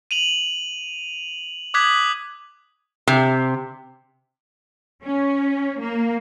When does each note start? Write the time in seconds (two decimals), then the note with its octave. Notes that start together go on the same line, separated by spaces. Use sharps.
0.11 D#7 F7 F#7
1.74 D6 D#6 F#6 G#6 B6 F#7
3.07 C3
5.04 C#4
5.80 A#3